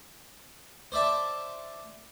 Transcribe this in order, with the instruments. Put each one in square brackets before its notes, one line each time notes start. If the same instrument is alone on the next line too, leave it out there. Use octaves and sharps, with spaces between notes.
[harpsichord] C5 D5 E5 A5